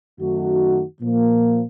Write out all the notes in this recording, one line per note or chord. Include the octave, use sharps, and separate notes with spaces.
F#2 D#3 A3 D#4 F#4
A#2 F3 A#3